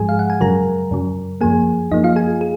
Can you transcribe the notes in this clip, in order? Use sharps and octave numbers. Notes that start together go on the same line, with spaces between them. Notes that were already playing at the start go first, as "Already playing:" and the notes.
Already playing: G#2 F3 G#3 G#4 G#5
F5
F#5
G#5
F#2 C#3 F#3 A#4 A#5
F#2 C#3 F#3
F#2 F3 A#3 G#4 G#5
F#2 F3 A#3 D#4 D#5
F4 F5
G#4 G#5
G#4